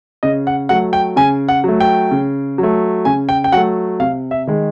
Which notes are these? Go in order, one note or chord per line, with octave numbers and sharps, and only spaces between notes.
C#3 D#5
F#5
F#3 A3 F#5
G5
C#3 G#5
F#5
F#3 A3
G5
C#3
F#3
A3
C#3 G#5
G5
G5
F#3 A3 F#5
C3 F5
E5
D#3 G#3